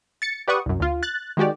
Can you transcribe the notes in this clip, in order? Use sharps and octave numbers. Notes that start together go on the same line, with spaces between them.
A6 C#7
G4 B4 D5 F#5 C#6 D#6
C2 F#2
D2 F4
F#6 A6
D#3 G#3 F#4 G4 D5